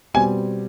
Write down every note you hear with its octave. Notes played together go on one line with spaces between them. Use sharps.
B2 G3 C4 G#5